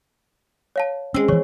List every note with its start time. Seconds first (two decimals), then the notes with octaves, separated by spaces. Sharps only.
0.76 C#5 F5 A5
1.14 G#3 C4 C#4 E6
1.28 D#3 E3 C#5 C#6